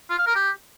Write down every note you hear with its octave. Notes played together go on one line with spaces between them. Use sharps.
F4
F5
A#4
G4